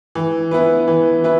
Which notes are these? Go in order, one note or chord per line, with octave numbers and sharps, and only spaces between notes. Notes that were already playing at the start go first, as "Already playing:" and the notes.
E3
B3 E4 B4
E3
B3 E4 B4